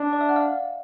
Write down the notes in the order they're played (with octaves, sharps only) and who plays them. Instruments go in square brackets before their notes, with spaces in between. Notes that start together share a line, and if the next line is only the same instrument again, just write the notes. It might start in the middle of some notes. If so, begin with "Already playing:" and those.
Already playing: [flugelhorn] D4
[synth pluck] D5
E5
F#5
F5